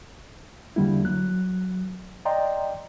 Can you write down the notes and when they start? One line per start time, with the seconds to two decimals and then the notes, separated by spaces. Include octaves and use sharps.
0.76 E2 D3 G3 A#3 E4
1.04 F#3 F#6
2.25 D5 D#5 G5 A#5 C6